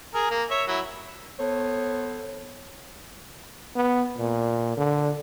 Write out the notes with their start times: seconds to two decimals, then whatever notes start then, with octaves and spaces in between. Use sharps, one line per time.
0.14 G#4 A#4
0.31 A#3
0.51 C#5 E5
0.68 F#3 E4
1.39 B3 A4 C5 C#5
3.76 B3
4.18 A#2
4.77 D3